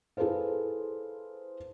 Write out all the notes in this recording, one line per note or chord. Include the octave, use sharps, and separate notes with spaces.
E4 G#4 A4 B4 C5 F5